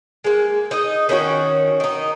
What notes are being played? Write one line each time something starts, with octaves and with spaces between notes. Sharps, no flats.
G#3 A#3
D#4 D#5
D#3 C#4 D#4 F#4
D#3 D#4